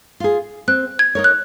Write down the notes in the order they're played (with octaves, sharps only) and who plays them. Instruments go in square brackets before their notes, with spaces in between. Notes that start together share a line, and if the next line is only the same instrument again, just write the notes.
[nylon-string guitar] F4 G#4
[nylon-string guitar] C4 [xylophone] F#6
[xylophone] G#6
[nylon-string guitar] D#4 A#4 C#5
[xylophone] F#6